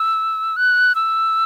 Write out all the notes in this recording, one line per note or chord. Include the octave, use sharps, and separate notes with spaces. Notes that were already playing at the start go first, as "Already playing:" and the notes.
Already playing: E6
F#6
E6